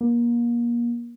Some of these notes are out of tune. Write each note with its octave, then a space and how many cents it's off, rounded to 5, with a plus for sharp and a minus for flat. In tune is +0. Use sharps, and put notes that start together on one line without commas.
A#3 +30